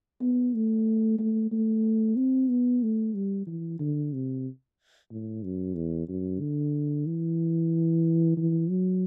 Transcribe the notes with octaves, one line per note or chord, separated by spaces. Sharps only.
B3
A3
A3
A3
C4
B3
A3
G3
E3
D3
C3
A2
F#2
E2
F#2
D3
E3
E3
F#3